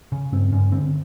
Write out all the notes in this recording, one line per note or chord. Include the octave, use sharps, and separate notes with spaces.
C#3 C#4
G2 C4
G2 C#4
D3 C4